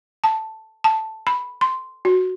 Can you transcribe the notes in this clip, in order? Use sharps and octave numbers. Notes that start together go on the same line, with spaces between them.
A5
A5
B5
C6
F#4